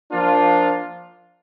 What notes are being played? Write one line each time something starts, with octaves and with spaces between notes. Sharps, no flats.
F3 A#3 D4 F4